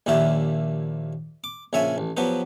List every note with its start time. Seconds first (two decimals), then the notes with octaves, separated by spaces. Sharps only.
0.06 A#1 D#2 A#2 E4 G4 E5
1.44 D6
1.73 A#1 C#3 C#5 E5 G#5
1.98 A1
2.17 F3 F#3 B3 G4 B4